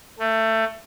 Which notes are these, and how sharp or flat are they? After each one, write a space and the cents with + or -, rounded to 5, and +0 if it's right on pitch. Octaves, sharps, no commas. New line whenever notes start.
A3 +20